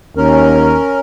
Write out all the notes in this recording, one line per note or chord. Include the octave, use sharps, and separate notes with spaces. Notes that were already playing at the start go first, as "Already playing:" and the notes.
D#2 C#4 A#4